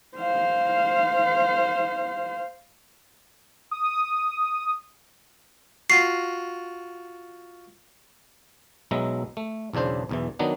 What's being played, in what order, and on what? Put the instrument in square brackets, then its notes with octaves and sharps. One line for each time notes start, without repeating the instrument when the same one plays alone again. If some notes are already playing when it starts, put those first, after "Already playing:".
[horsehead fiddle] C5 F5
[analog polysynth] D#6
[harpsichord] F4 F#4 [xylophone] C7
[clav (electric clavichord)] B1 F#3 G#3 B3 E5 A#5
A3
B1 E2 C#3 D4 C5
B1 E2 E3
D#3 F#3 B3 D4 D#4